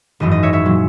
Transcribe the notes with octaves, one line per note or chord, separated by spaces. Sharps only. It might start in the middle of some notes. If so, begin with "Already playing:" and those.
G#1 F#2 E3 D#5
D#5
C#5 E5
C#5 E5
A#2 F#3